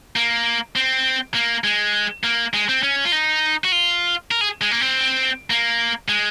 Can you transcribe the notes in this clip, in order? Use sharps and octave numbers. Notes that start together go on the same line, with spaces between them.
A#3
C4
A#3
G#3
A#3
G#3
C4
C#4
F4
D#4
F#4
F4
A#4
G#4
G#3
A#3
C4
A#3
G#3